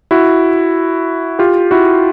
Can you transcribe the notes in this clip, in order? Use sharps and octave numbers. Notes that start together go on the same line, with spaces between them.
E4 F#4
F4 G4
E4 F#4